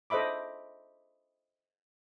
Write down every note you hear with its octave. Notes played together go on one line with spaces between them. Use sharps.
A4 C5 D#5 E5 B5 D6